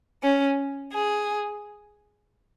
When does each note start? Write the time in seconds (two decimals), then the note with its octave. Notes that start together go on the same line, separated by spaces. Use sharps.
0.23 C#4
0.93 G#4